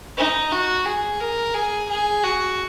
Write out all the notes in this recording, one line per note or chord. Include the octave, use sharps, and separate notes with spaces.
D#4
F#4
G#4
A#4
G#4
G#4
F#4